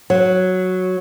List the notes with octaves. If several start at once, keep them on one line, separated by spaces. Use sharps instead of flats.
F#3